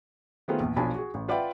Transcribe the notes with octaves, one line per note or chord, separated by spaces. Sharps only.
D#3 A3 B3 F4 G#4 C5
A#1 E2
B1 F3 D4 G#5 A5 B5
F#4 G#4
A1
F4 B4 D5 E5 F#5 G5